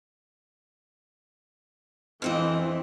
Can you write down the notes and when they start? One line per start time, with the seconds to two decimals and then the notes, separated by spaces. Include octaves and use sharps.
2.22 F2 E3 C4 D#5